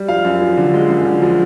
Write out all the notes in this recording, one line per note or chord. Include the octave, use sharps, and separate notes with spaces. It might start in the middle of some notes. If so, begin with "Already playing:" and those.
Already playing: G3
F3 F5
F#2
F3
D3
G#3
F#2
D3
F3